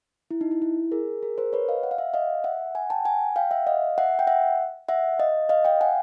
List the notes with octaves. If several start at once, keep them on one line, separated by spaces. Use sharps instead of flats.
E4
D#4
E4
E4
G#4 A#4
G#4 A#4
A#4 C5
B4 C#5
D#5 F5
F#5
F5
E5 F#5
D#5 F5
E5 F#5
F#5 G#5
G5 A5
F#5 G#5
F5 G5
E5 F#5
D#5 F5
E5 F#5
G5
E5 F#5
E5 F#5
D#5 F5
D#5 F5
F5 G5
F#5 G#5